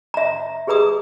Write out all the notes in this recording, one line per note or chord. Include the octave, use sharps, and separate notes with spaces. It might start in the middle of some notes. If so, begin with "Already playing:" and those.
E5 A#5
G4 G#4 B4 A#5 D#6